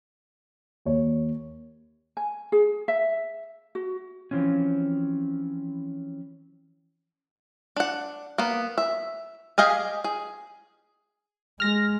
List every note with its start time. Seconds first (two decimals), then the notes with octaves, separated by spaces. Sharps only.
0.85 D#2 C#5
2.17 G#5
2.52 G#4
2.88 E5
3.75 F#4
4.31 E3 F3 C4 C#4
7.77 D4 F#5
8.38 A#3 B3
8.78 E5
9.58 G4 G#4 D#5 F5 G#5
10.04 G#4
11.60 G#3 F6 A#6